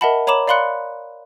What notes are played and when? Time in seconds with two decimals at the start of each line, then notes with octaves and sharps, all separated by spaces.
0.01 A#4 D#5 E5 F#5 A5 B5
0.27 C#5 A#5 B5 D6 E7 F#7
0.48 D5 F5 B5 C6 F#6 C#7